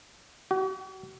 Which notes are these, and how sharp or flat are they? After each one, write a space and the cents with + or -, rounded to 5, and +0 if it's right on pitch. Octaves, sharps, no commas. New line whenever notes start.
F#4 +45